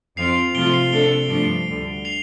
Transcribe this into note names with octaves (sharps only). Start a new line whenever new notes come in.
F2 F3 C4 F4 C7 F7
C3 F3 A3 F4 D7 G7
C7 F7
C3 A3 D4 A4 D7 G7
G2 F3 A3 D4 D7 G7
D2 D3 G3
C7 F7